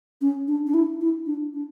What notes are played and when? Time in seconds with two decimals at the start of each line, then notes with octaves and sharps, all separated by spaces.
0.21 C#4
0.48 D4
0.67 D4
0.74 E4
1.01 E4
1.26 D4
1.54 D4